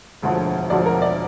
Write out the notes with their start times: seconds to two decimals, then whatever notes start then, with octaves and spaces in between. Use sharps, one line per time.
0.22 E1 D2 D3 F3
0.70 E1 D2 D3 F3 D5
0.86 A#4
1.02 D5